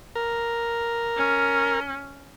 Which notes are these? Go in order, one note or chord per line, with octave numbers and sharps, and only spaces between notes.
A#4
C#4